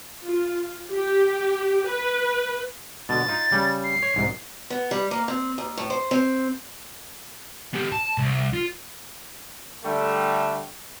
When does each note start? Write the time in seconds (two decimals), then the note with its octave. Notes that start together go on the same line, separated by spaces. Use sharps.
0.23 F4
0.92 G4
1.88 B4
3.09 B2 D3 A6
3.28 D#4 F4
3.52 C#3 G3
3.84 C7
4.03 C#5
4.16 C2 G#2
4.70 B3
4.91 G3
5.11 A#3
5.28 C4
5.58 D#2
5.77 A2
5.90 C5
6.11 C4
7.73 B3 G4
7.92 A5
8.18 C2
8.53 F4
9.84 D3 G3 A3